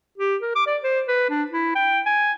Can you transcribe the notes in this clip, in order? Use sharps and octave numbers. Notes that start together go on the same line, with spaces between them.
G4
A#4
D6
D5
C5
B4
D4
E4
G5
G#5